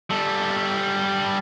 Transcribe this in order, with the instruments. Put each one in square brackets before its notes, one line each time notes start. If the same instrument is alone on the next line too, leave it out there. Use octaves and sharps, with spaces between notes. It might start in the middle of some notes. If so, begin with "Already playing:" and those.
[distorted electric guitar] G3 A4